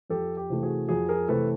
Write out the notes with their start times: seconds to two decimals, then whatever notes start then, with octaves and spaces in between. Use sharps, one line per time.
0.10 F2 G4 A4
0.37 G4
0.50 C3 E3 A3
0.63 F#4 G#4
0.89 F2 F#4 G#4
1.09 G#4 A#4
1.28 C3 E3 A3 A4 B4